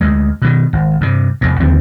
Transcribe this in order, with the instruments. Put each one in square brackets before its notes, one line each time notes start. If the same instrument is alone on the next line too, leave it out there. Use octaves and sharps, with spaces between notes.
[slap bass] D2 G#3
B2 D#3
G#1
G2 C3
F1 E2 G#2
D#2 D3 F3 C4